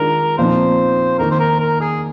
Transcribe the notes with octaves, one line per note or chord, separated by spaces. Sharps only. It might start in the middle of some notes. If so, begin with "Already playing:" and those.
Already playing: D#3 G#3 D4 F4 A#4
A#2 F3 C4 D#4 C5
D#3 A#3 D#4 A#4
C5
A#4
A#4
G#4